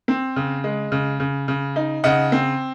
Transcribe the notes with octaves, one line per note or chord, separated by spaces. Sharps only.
C4
C#3
G#3
C#3
C#3
C#3
D#4
C#3 D#5 F#5
C4